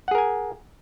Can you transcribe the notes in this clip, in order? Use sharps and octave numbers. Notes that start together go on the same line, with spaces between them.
G#4 A#4 F#5 G#5